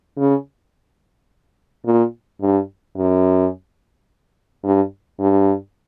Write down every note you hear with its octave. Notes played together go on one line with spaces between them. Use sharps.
C#3
A#2
G2
F#2
G2
G2